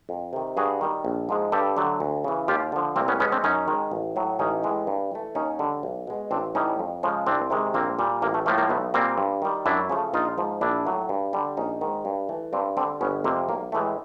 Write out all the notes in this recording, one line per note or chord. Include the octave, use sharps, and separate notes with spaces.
F2
C3 D#3
G2 F#4 G#4
D#3 G3
A#1
G#2 F3 G#3
G2 G4 A4
D3 F#3 A3
D2
C#3 E3
D#2 F4 G4
D3 F3
C2 A#3 C4
B3 C#4
B2 G#3 B3 C#4
C4 D4
F#2 C#4 D#4
D#3 G#3
A1
A2 F#3
A1 C#4 D#4
A2 E3 G#3
G2
E3 A3
D#2 C#4 D#4
D3 G3
B1
B2 G#3
A1 C4 D4
A2 E3 G3 C#4 D#4
F2
C#3 F3 G#3
C2 C4 D4
C3 D#3 G#3
A#1 A#3 C4
A#2 G3
A1 A#3
A3
A2 F3 A3 A#3
A#3
B1 A3 B3
A#2 G3 A#3 C4
G2
D#3 G3
F#2 D4 E4
C#3 F3 A3
A#1 D#4 F4
G#2 F3
A#1 D4 E4
A2 F#3 A3
G2
D3 G3
A#1 C#4 D#4
G#2 D#3
G2
E3 A3
G2 C4 D4
D3 G3 C4 D4
G1 B3 C#4
F2 C3 A#3 C4
B1 A#3
A2 E3 G#3 A3